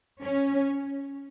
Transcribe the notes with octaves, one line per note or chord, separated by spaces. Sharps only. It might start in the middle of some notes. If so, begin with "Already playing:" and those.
C#4